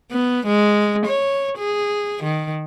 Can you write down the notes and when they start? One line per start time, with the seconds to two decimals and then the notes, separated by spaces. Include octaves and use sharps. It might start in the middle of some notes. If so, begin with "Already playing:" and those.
0.11 B3
0.46 G#3
1.06 C#5
1.58 G#4
2.23 D#3